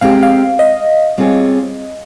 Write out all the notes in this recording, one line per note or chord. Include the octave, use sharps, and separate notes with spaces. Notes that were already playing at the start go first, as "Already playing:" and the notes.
G#3 C4 G4 A#4 F5
F5
D#5
G3 C4 F4 G#4 C#5